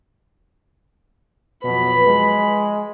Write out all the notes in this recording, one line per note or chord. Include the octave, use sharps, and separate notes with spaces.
F2 B2 F#3 B4 B5
G#3